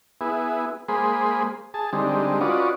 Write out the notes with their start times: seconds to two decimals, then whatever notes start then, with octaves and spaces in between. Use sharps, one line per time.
0.21 B3 E4 G#4
0.88 G#3 A#3 G#4 C5 B5
1.74 G#4 A5
1.93 D3 G3 G#3 C4 D#4
2.41 C#4 F4 F#4 B4 D5 D#5